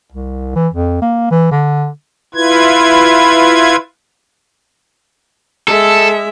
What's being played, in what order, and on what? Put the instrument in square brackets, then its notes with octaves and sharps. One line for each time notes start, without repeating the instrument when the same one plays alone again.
[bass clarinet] C2
E3
F2
A#3
E3
D3
[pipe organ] E4 F4 B4 G#6
[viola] G#3 E5 [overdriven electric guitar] A4